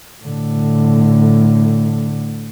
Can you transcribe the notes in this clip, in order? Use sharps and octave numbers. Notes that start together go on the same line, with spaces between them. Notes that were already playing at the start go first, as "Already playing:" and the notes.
A2 D3